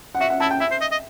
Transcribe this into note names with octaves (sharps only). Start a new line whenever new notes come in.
F#5
F#4 E5
F#5
E4 A5
G5
E4 E5
C5
D#5
D#5